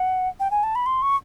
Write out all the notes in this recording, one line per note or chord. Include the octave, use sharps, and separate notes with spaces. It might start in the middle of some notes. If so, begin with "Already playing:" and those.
Already playing: F#5
G5
G#5
A5
B5
C6
C#6